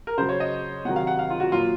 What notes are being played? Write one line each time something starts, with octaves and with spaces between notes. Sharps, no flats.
A#4
C#3 F#3 C5
C#5
D#5
C3 D#3 F#3 F#5
F5
F#5
F5
F4
F#4
A#2 F#3 F4